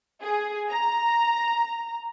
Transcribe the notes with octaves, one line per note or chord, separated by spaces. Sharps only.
G#4
A#5